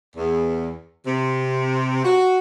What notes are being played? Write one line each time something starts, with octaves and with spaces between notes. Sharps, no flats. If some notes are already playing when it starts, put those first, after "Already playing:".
E2
C3
F#4